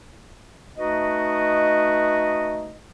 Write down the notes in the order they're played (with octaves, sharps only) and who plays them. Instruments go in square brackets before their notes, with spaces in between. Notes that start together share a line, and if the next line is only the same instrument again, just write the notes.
[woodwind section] A3 D#4 F#4 B4 D#5